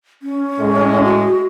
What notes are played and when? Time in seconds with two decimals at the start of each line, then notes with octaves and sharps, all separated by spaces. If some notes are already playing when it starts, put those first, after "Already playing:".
0.22 C#4
0.59 A2 G#3
1.04 F#4